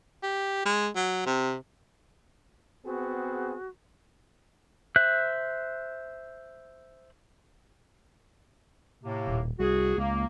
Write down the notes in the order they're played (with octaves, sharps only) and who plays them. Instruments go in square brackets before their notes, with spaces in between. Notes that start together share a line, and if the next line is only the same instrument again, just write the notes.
[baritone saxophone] G4
G#3
F#3
C3
[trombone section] B3 C4 G#4 [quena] F#4
[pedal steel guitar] C5 E5 F#6
[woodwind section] A2 C3 A#3
[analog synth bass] D#1
[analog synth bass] C2 [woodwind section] F#4 G#4
[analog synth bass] C#2 [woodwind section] A#3